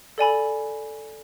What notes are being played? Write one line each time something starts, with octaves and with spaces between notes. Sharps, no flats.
A4 D5 G#5 B5